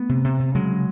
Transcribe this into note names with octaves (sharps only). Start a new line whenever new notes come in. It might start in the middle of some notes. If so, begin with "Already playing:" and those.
Already playing: A3 B3
C3
C3
C3
C#3 F#3 G#3